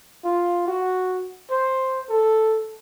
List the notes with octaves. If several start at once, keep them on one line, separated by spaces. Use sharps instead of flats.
F4
F#4
C5
A4